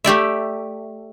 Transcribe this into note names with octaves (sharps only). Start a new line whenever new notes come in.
A3 G4 D5 E5